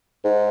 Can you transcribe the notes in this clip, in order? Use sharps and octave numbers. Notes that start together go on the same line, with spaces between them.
G#2